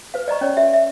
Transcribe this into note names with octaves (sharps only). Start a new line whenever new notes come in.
B4 C5 F5
D5 D#5 A#5 C#6
C#4 C#5 D5
G4 E5
E5